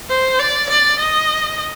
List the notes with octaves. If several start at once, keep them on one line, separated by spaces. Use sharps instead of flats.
C5
D5
D5
D#5